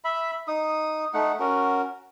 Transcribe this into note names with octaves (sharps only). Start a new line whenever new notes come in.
E5 B5
D#4 D#6
A3 D#4 F#5
C#4 F#4 A#4